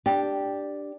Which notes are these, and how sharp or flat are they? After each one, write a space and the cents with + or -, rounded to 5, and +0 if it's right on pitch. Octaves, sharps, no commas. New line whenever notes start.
D4 +0 G4 +0